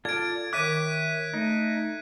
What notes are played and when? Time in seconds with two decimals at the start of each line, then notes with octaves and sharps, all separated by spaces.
0.05 F4 A4 D5 G#6 D7
0.53 D#3 C#5 E5 D6 F#6 B6 D#7
1.34 A3 D#4